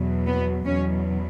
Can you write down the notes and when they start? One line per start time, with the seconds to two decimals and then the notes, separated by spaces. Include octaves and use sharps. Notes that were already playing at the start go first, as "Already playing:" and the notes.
Already playing: E2 B2 F#3
0.26 B3
0.66 E2 B2 F#3 C#4